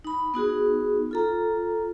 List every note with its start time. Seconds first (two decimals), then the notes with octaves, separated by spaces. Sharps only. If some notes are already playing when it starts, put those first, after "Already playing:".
0.05 D#4 B5
0.34 B3 D#4 F#4 G#4
1.11 F4 A4 A#5